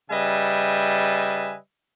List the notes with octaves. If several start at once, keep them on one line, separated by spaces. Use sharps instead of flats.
C#3 G3 B4 D#5 E5 G#5